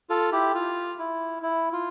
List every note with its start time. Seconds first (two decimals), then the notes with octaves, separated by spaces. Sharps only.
0.10 F4 A4
0.32 E4 G4
0.54 F4
0.99 E4
1.43 E4
1.73 F4